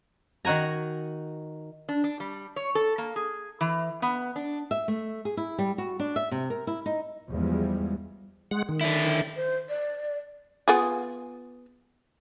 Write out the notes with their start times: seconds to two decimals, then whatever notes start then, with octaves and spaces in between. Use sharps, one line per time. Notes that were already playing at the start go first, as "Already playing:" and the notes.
0.45 D#3 D#4 F#4 G#5 A#5
1.89 D4
2.04 D4
2.20 G3
2.56 C#5
2.75 A4
2.98 A#3
3.16 G#4
3.61 E3
4.02 B3
4.36 D4
4.71 E5
4.88 A3
5.25 G#4
5.37 E4
5.59 G3
5.78 F#4
5.99 D4
6.16 E5
6.31 C3
6.50 A#4
6.67 E4
6.86 D#4
7.29 E2 F3 G3 G#3
8.51 G#3 F#5
8.69 D#3
8.81 D3 E4
9.36 C5
9.69 D5
10.68 B3 F4 G#4